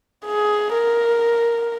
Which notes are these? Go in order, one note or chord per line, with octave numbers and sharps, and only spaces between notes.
G#4
A#4